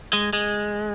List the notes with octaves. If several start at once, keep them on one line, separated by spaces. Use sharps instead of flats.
G#3
G#3